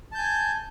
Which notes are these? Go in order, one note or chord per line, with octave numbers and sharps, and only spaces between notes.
G#5 A5 G6